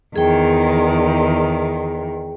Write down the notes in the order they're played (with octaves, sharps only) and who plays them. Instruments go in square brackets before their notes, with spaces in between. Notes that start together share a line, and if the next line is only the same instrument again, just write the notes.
[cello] E2 D#3 [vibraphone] G#4 G5